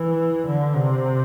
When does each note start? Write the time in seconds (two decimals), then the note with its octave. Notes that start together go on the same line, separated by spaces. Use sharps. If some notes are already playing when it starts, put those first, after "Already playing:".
Already playing: E3
0.47 D3
0.75 C3